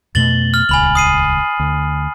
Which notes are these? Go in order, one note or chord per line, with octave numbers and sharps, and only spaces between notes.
F2 B2 A3 A6 F#7 G7
F6
D#1 C#2 G#5 B5 F#7
D#6 C7 D#7
D2